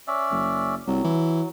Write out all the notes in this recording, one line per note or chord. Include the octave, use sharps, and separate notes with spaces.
C#4 D5 E5
F#1
C2 F#3
E3